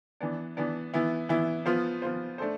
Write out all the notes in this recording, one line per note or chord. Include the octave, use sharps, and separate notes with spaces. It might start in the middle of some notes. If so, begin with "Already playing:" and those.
E3 B3 D4
E3 B3 D4
E3 B3 E4
E3 B3 E4
F3 B3 F4 C5
F3 B3 F4 C5
A3 D4 A4 C5